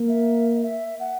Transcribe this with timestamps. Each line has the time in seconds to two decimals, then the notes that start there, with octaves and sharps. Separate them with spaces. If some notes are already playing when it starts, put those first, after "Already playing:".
Already playing: A#3
0.09 E5
0.63 E5
1.00 F#5